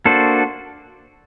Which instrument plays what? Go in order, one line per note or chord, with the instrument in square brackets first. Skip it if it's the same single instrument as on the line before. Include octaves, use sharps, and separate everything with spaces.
[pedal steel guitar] A#3 D4 F#4 A4 C5